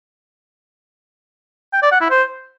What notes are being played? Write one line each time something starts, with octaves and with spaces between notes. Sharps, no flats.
G5
D5
F#5
E4
C5